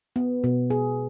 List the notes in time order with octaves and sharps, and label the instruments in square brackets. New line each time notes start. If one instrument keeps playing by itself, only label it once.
[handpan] B3
B2
G#4